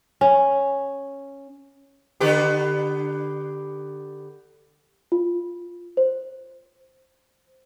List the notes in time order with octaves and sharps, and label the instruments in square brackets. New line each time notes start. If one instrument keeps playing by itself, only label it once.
[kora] C#4
[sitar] D3 B3 G4
[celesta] F4
C5